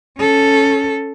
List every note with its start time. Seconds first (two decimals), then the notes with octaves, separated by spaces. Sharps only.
0.18 C#4 A4